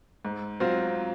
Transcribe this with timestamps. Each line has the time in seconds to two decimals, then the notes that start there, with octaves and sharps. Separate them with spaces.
0.25 G#2
0.60 F#3 C4 F4